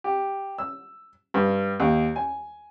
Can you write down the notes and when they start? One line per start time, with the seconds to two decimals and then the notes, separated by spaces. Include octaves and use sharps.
0.04 G4
0.58 E6
1.34 G2
1.80 D#2
2.16 G#5